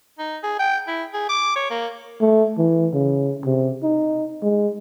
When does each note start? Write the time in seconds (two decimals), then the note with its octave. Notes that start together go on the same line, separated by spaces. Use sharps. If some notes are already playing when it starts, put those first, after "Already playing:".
0.19 D#4
0.43 G#4
0.59 G5
0.88 E4
1.13 G#4
1.29 D6
1.56 C#5
1.71 A#3
2.20 A3
2.58 E3
2.93 C#3
3.45 C3
3.83 D#4
4.42 G#3